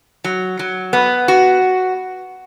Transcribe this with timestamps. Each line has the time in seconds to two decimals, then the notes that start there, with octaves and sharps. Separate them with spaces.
0.24 F#3
0.59 F#3
0.93 B3
1.28 F#4